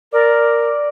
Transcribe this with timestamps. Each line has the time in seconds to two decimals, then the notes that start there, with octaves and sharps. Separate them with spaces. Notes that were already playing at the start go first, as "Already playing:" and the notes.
0.12 A#4 D5